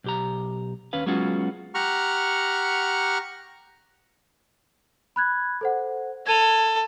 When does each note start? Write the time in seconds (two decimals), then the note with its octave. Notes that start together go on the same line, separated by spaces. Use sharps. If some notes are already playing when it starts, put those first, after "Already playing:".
0.04 B1 G4 A#5
0.93 D#2 C#4 B4 F5
1.06 F#3 G#3 B3 C#4 F4 F#4
1.74 G4 F#5 A#5 C#6 F6
5.16 B5 F#6 G#6
5.61 A4 C5 F#5
6.27 A4 G#6 D#7 F7